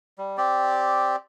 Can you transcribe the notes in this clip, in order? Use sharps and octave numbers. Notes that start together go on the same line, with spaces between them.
G3
C4 G4 D5